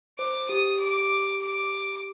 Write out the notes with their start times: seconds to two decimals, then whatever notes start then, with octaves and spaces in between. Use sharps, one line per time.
0.18 C5 D6
0.49 G4 D#6
0.80 D6
1.41 D6